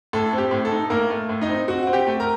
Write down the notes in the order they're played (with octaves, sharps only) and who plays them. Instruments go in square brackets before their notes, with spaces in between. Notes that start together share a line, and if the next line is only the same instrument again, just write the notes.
[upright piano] A2 A4
C4
G4
A2
A4
D#4
A2 A#3 A#4
A3
A2
D#4 D#5
C4
C4 F#4 F#5
C4 F#5
G4 G5
A3
A#4 A#5